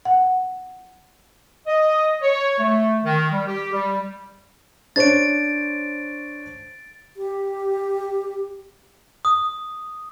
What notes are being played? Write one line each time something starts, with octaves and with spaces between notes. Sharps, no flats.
F#5
D#5
C#5
A3
D#3
G3
G4
G3
D4 C5 C#5 A6 D7
G4
D#6